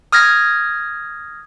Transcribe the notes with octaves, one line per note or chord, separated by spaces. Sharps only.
D#6 F6 G#6 A#6